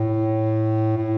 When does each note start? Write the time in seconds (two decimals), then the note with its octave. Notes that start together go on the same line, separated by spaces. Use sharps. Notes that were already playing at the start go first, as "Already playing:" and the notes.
Already playing: A2
0.97 A2